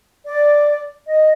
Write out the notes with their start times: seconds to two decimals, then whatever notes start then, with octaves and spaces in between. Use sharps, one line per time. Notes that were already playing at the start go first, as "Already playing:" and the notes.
0.24 D5
1.08 D#5